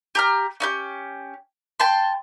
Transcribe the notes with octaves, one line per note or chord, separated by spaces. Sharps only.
G4 A#5 F6
C#4 D#4 G4
G5 A5 C6